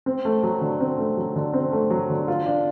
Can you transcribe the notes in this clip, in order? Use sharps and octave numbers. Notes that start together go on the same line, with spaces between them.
C4
A3
F#3
D3
C4
A3
F#3
D3
C4
A3
F#3
D3
F4
D4